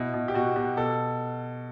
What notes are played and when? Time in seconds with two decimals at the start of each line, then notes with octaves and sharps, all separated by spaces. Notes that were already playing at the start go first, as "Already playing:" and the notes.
Already playing: B2 E4
0.14 B2
0.28 G4
0.34 B2 F#4
0.56 B2 G4
0.77 B2 A4